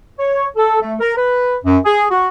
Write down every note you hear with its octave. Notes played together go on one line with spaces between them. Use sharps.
C#5
A4
A3
A#4
B4
F#2
G#4
F#4